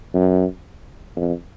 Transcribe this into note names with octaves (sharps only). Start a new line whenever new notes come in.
F#2
F2